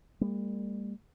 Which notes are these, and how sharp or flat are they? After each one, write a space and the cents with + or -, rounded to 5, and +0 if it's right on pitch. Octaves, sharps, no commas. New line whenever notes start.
G3 +35 A#3 -35